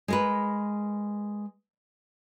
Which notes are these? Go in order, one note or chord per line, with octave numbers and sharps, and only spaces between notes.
G#3 A#4 B4